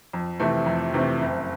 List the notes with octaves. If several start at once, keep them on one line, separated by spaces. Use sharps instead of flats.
F2
C3 E3 A3 C4
F2
C3 E3 A3 C4
F#1